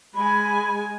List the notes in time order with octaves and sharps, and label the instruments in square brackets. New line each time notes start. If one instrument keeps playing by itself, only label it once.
[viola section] G#3 G#5 [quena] B5